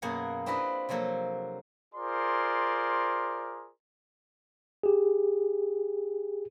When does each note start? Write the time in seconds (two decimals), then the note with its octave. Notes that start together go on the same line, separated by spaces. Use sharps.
0.02 F#2 B2 A#3 G#4 F#5
0.46 C4 D4 E4 F4 B4 D#5
0.89 C3 F3 F#3 A#3 A4
1.94 F4 G#4 A#4 C5 D5 C6
4.83 G4 G#4